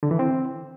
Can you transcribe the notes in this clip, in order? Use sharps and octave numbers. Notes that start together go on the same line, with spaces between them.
D3
E3
C4